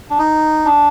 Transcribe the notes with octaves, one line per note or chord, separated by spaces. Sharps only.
D4
D#4
D4